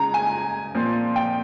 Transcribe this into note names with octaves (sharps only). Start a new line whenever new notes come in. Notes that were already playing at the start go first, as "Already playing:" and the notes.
Already playing: C#3 G#3 A#5
G#5
A#2 F3 C4
G5